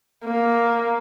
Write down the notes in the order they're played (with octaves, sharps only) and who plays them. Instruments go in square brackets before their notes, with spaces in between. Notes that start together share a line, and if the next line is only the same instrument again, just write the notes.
[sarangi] A#3